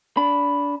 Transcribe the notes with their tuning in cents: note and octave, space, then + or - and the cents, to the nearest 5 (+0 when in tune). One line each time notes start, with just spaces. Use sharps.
D4 -25 B5 +0